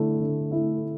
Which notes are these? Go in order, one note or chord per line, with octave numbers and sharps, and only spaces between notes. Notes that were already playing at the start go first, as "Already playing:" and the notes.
Already playing: D3 A3 E4
D3
A3 E4